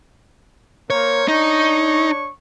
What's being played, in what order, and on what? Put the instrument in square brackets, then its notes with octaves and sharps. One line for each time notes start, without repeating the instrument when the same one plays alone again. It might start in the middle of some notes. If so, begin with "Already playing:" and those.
[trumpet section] A#3 A#4 C5 [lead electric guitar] C#5
[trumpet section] D4 C#5 C#6 [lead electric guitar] D#4